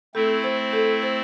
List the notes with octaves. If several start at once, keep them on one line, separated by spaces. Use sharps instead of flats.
A3 C4 E4 A4
C5
A4
C5